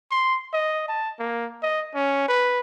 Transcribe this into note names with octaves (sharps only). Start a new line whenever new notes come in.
C6
D#5
A5
A#3
D#5
C#4
B4